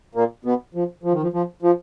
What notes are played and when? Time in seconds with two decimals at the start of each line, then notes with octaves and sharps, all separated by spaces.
0.15 A#2 A#3
0.44 B2 B3
0.75 F3
1.03 F3
1.12 D#3
1.23 F3
1.33 F3
1.62 F3